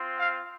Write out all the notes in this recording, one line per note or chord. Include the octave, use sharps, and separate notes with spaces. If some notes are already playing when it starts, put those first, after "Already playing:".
Already playing: C4 F4
F5